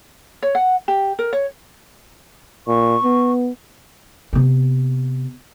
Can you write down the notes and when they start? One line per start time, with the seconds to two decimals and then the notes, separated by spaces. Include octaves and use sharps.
0.43 C#5
0.55 F#5
0.88 G4
1.19 A#4
1.33 C#5
2.67 A#2 C#6
3.04 B3
4.33 C3 B3